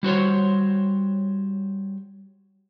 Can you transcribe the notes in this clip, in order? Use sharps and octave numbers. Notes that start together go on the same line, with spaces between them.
G3 F#4 C5 C#5